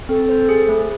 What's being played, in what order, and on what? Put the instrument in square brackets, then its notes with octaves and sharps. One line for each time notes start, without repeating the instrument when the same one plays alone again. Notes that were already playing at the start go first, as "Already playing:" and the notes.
[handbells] C4 [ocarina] A4
[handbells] C5
G#4
A3